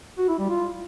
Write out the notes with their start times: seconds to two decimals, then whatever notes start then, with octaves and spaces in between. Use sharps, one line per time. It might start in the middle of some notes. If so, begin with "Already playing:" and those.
0.18 F#4
0.29 E4
0.39 G3
0.49 F4